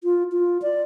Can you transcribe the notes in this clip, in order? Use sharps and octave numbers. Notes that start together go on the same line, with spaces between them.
F4
F4
D5